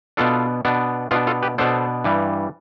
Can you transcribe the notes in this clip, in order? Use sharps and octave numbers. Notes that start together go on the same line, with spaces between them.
B2 B3 D4 F4 A4
B2 B3 D4
B2 B3 D4 F4
F4 A4
G4 B4
B2 B3 D4 A4 C5
G2 E3 G3